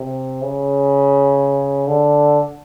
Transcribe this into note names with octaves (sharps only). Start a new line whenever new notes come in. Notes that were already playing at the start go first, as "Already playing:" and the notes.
Already playing: C3
C#3
D3